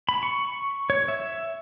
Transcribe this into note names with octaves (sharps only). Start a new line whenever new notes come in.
B5
C#6
C#5
E5